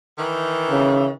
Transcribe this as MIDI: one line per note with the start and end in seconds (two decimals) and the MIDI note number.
0.18 1.12 51
0.18 1.12 52
0.71 1.10 49